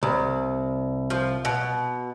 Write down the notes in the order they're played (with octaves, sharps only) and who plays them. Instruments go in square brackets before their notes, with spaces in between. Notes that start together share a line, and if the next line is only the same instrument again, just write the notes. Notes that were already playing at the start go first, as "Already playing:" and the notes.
[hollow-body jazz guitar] C2
[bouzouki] F3
B2